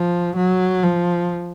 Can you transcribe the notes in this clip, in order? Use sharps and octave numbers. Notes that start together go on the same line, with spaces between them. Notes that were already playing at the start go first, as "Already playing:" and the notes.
Already playing: F3
F#3
F3